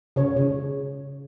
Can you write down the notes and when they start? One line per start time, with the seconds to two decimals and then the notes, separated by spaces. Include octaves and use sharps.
0.16 C#3 C#5
0.37 C#3